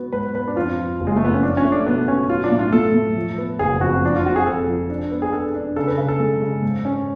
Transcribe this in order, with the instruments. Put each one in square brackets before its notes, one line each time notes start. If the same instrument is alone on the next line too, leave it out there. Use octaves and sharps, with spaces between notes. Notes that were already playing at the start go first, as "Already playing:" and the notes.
Already playing: [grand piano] B3 F#4
[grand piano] G#2 [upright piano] B4
[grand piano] B3 [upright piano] B4
[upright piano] D4
[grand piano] F2 [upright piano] F4
[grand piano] F3
F#1
[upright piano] G#3
A3
[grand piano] F3 [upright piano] B3
[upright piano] C#4
[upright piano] D4 [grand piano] F4
[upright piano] C#4
[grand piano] A3
[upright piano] D4
[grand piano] B2 [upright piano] B3
[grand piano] B2 [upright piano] C#4
[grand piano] F#3 [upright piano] F4
[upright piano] D4
[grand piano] A2
[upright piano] F4
[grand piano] A2 [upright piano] A4
[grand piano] A2
F3
B3
[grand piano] F#1 [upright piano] G#4
[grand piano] F2 [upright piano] F#4
[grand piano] F3 [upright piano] D4
[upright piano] F4
[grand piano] F2 [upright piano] F#4
[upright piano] G#4
[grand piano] F2 [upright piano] A4
[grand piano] F3
D4
B3
[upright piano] G#4
[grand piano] D4 [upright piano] A4
[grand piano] D4
[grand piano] C#3 [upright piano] A4
[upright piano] B4
[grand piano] C#3
[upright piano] A4
[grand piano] G#3
C#3
G#2
C#4